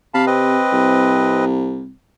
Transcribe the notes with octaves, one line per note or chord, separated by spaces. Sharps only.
C3 F5 A5 B5
C4 B4 D#5
C2